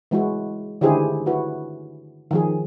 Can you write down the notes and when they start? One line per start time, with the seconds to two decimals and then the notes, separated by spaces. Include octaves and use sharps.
0.11 E3 G#3 E4 F#4
0.81 D3 D#3 E4 G4 G#4 C5
1.26 E4 F#4 B4
2.31 D#3 F3 G#4